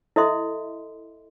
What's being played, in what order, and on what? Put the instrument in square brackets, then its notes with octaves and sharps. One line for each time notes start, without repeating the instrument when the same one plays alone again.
[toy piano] E4 A4 D#5 E5 C6